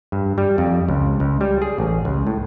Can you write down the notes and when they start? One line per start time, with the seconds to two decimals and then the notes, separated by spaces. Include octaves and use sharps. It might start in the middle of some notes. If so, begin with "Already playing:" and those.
0.12 G2
0.38 G3
0.58 F2
0.89 C#2
1.20 C#2
1.41 G3
1.62 G#4
1.78 A1
2.05 C#2
2.27 A2